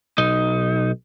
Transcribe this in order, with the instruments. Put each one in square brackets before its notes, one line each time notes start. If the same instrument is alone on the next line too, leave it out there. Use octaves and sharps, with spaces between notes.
[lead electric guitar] B1 D#4